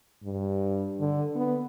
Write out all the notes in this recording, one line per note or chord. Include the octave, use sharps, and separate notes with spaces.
G2
D3
B3